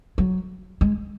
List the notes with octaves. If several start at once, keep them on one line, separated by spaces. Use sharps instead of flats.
F#3
G#3